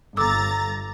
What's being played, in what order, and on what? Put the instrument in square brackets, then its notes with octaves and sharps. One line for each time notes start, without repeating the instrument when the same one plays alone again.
[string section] G1 A#5 A6 [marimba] A4 D6 E6